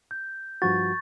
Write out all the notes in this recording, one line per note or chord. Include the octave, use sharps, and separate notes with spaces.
G6
G2 F3 F#4 C#6 A6